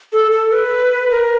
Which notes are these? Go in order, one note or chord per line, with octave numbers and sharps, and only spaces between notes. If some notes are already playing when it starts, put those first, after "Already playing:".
A4
A4
B4
A#4